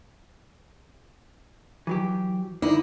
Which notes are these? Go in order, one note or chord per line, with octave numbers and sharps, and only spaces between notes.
E3 F#3 G4
D3 D#4 E4